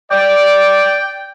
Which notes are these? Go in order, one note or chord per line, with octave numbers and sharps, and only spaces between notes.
D5 G5